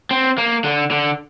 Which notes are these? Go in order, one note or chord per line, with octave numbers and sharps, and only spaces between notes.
C4
A#3
D3
D3